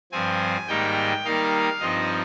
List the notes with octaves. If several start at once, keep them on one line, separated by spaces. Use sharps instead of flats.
G2 F3 C4 G#5
G#2 D#3 G3 A#3 D#4 G5
D#3 G3 A#3 D#4 F5
G2 F3 C4 D#4 D#5